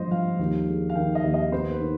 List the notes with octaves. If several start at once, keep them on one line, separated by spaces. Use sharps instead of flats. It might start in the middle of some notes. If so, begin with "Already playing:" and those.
Already playing: G#1 G2 F3 C5 D#5
F3 F5
D#2
G#3
F5
D#3 G5
D#5
D#2
D#5
B3 C5
B4
D#3